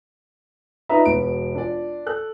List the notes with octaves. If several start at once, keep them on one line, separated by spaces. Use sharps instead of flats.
D4 D#4 F4 B4 E5 A#5
E1 B2 B4 D7
D4 F4 D5
A4 F#6